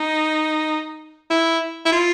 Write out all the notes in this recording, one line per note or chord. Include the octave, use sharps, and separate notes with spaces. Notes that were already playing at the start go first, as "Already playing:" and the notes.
Already playing: D#4
E4
E4
F4